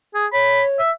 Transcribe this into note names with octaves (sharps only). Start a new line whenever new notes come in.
G#4
C#5 B5
E5